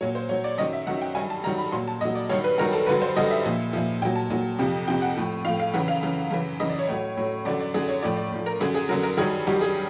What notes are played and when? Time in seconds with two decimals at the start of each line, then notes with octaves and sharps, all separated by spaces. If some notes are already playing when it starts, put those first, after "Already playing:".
0.01 A#2 F#3 C#5
0.15 C5
0.29 A#2 F#3 C#5
0.44 D5
0.58 F#2 D#3 F#3 D#5
0.73 E5
0.87 F#2 D#3 F#3 F#5
1.02 G5
1.15 G2 D#3 F#3 G#5
1.30 A5
1.44 G2 D#3 F#3 A#5
1.58 B5
1.72 A#2 F#3 C6
1.88 A5
2.01 A#2 F#3 D#5
2.15 D5
2.29 G2 D#3 F#3 C#5
2.44 B4
2.58 G2 D#3 F#3 A#4
2.73 A4
2.87 G2 D3 F#3 B4
3.02 C5
3.16 G2 D3 F#3 D#5
3.31 E5
3.45 A#2 F3
3.73 A#2 F3
4.02 A#2 F#3 G5
4.16 A5
4.30 A#2 F#3
4.59 F2 C3 F3
4.88 F2 C3 F3 G5
5.02 F#5
5.17 A2 F3
5.45 A2 F3 F5
5.60 F5
5.74 F#2 C#3 E3 F#5
5.88 F5
6.03 F#2 C#3 E3
6.31 F#2 C#3 E3
6.60 F#2 C#3 E3 D#5
6.69 D5
6.79 C#5
6.89 A2 F#3
7.17 A2 F#3
7.45 F#2 D3 F#3 D5
7.60 D5
7.74 F#2 D3 F#3 G#4
7.88 C#5
8.03 A2 F3 D5
8.17 D5
8.32 A2 F3
8.46 A#4
8.60 F#2 D3 F#3 G#4
8.74 G#4
8.89 F#2 D3 F#3 A#4
9.03 A#4
9.17 G2 D#3 F#3 G#4
9.47 G2 D#3 F#3 G4
9.61 G#4